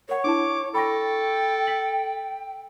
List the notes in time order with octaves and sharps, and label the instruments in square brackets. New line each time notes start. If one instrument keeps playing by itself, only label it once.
[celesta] A#4 F#5 [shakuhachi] C#5
[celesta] D4 E4 A5 [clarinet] D6
[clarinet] A4 [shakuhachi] G5 [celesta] B5 C#6 A#6
[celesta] B6 F#7